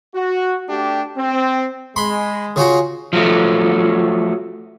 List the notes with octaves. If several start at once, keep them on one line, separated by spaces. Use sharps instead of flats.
F#4
A3 D4 G4
C4
G#3 B5 C6
C#3 F4 F#4
F3 F#3 A3